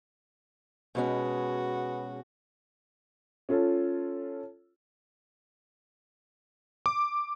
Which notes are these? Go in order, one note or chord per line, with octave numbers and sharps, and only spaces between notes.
B2 G#3 C#4 F#4 G#4 B4 B5
C#4 F4 A4
D6